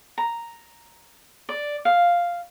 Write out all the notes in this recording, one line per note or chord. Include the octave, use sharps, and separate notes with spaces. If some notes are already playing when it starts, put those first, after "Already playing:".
A#5
D5
F5